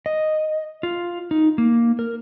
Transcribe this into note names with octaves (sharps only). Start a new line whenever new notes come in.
D#5
F4
D#4
A#3
A#4